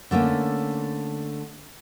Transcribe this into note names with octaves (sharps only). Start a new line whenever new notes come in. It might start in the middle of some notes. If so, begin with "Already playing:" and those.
D3 A3 A#3 C#4